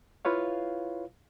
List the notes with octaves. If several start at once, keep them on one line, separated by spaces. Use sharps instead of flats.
E4 F4 B4 C#5 F5